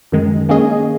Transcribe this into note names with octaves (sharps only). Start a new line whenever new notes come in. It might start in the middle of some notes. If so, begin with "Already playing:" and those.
F#2 D#3 G#3
D#3 A#3 C#4 G#4 D#5